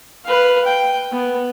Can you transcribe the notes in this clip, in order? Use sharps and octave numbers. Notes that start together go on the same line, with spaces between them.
B4 F5
G5
B3